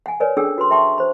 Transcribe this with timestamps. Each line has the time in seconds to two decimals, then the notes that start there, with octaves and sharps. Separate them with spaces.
0.06 F#5 G#5
0.20 A#4 B4 C#5 D5 G#5
0.37 C#4 D4 G#4 A4 G5 E6
0.58 F#4 B4 C6
0.71 E5 G5 A5 C6 C#6
0.98 C5 B5